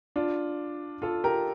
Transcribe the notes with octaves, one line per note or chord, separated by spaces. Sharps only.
D4 F4
F4 A4
G4 A#4